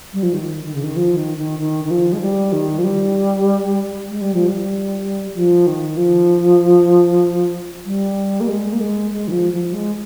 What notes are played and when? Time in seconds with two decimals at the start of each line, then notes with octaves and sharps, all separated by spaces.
0.13 G3
0.23 F3
0.33 D#3
0.65 D#3
0.74 C#3
0.83 D#3
0.96 F3
1.16 D#3
1.37 D#3
1.59 D#3
1.85 D#3
1.91 F3
2.13 G#3
2.21 G3
2.53 D#3
2.79 F3
2.84 G3
4.09 G#3
4.21 G3
4.34 F3
4.48 G3
5.35 F3
5.67 D#3
5.97 F3
7.85 G3
8.41 A#3
8.48 G#3
8.72 A#3
8.80 G#3
9.11 G#3
9.28 D#3
9.32 F3
9.53 F3
9.73 G#3